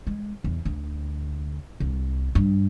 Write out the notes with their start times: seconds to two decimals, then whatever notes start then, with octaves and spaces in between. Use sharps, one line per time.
0.07 G#3
0.44 E2
0.65 D2
1.80 C2
2.35 G2